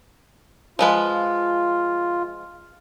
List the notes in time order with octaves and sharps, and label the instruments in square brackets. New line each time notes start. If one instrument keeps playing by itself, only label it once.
[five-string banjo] F3 G#3 B4 [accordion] F4